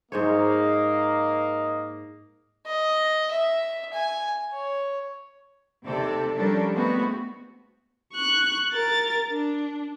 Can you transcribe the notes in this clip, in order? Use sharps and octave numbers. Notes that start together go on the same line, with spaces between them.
G#2 A#3 C5 C#5 D#5
D#5
E5
G#5
C#5
D#2 C3 C4 A4 D5
F3 G3 C#4 D4 A4 A#4
G#3 A3 B3 C4 F#4
C#6 F#6
A#4 A6
D4